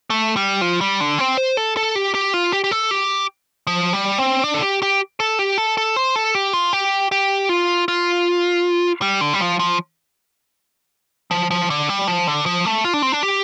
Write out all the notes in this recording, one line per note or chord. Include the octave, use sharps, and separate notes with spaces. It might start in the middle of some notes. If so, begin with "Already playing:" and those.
A3
G3
F3
G3
D3
C4
C5
A4
A4
G4
G4
F4
G4
G4
A4
G4
F3
G3
C4
D4
A4
G4
G4
A4
G4
A4
A4
C5
A4
G4
F4
G4
G4
F4
F4
G3
D3
G3
F3
F3
F3
F3
D3
G3
F3
D3
F3
A3
F4
D4
C4
D4
G4